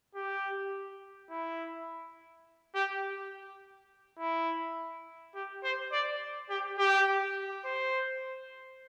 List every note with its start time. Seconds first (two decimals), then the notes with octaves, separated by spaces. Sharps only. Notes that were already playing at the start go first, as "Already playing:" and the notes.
0.15 G4
1.30 E4
2.75 G4
4.19 E4
5.35 G4
5.63 C5
5.92 D5
6.50 G4
6.78 G4
7.65 C5